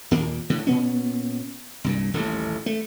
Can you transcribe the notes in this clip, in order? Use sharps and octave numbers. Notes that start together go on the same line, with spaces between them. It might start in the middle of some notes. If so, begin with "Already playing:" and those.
D#2 A#2 A#3
A2 D3
A#2 B3 C#4
C2 G2 A#2
D#1 A1 D#2 A3
A3